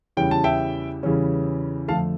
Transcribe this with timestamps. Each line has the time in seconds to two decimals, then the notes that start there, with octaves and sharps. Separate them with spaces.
0.17 E2 C#3 E3 G3 C#4 G5
0.31 A5
0.44 E5 G5
1.03 E2 C#3 E3 G3 C#4
1.88 F2 D3 F3 A3 F5 A5